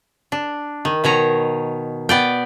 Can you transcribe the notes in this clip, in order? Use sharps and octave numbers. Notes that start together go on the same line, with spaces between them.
D4
D#3
B2 D#3 C#5 A#5
B3 D5 G5